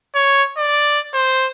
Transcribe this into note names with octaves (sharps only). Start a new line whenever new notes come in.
C#5
D5
C5